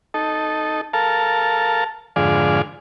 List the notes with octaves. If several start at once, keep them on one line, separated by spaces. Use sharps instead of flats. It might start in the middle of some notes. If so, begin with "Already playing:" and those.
D#4 A4
A4 A#4 F5 A5
F2 G#2 D3 G#4 D5 F5